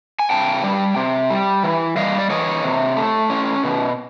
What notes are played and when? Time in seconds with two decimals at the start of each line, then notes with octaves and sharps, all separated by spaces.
0.19 G#5
0.30 C3 G5 A5
0.64 G3
0.96 C3
1.30 G3
1.63 E3
1.97 G3 D#5 F5
2.19 D5
2.30 E3 C#5 D#5
2.64 C3
2.97 A3
3.30 C#4
3.63 B2